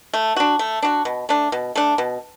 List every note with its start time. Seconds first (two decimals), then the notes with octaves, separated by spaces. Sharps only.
0.13 A3
0.36 D4 F#4
0.59 A3
0.83 D4 F#4
1.05 B2
1.29 A3 D4
1.52 B2
1.75 A3 D4
1.98 B2